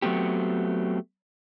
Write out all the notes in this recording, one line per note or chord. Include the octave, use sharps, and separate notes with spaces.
F#3 A3 B3 C4 G4